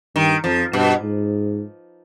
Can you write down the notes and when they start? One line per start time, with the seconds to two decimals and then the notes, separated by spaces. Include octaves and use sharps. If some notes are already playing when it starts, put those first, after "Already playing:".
0.15 G2 D#3
0.44 F2 F3
0.73 G2 B2
1.02 G#2